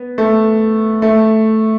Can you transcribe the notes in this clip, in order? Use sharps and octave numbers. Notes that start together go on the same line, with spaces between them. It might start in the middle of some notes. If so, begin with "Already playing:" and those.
Already playing: B3
A3
A3